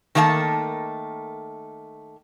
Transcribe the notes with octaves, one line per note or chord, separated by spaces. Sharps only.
D#3 A3 A#3 C#5 A5